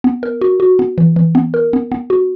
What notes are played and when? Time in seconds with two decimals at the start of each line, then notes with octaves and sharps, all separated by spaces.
0.04 B3
0.23 A#4
0.41 F#4
0.60 F#4
0.79 B3
0.98 E3
1.16 E3
1.35 B3
1.54 A#4
1.73 B3
1.92 B3
2.10 F#4